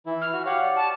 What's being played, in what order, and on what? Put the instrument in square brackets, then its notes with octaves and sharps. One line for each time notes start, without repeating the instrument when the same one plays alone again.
[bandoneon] E3 E4
[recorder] F6
[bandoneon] F#4
[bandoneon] G4 C#5 F5 [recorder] F#5
[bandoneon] D5
[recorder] A5